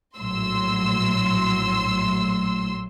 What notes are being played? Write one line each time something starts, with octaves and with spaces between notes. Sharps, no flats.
A#1 A2 F#3 C6 E6